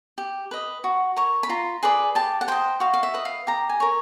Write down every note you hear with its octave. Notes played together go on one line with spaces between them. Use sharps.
G4
B4 D#5
F#4
A#4 C#5
B5
F4 A#5
G#4 B4 D5
G4 A5
F#5
C5 D#5 G5
F#4 F5
F5
E5
B4 D#5
F5
G4 A#5
G#5
A#4 C#5